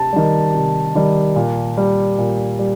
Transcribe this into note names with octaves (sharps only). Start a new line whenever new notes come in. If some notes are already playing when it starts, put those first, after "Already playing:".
Already playing: C3 A5
D#3 G3
C3
D#3 G3
A#2
G3
A#2
G3